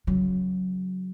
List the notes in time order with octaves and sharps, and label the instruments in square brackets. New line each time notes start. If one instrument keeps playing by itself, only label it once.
[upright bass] C#3 F#3